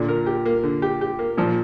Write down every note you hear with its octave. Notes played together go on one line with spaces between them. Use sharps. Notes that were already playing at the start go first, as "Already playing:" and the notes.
Already playing: A#2 D3
A#4
G4
A#3
D3
G4
G4
A#3
A#2 F3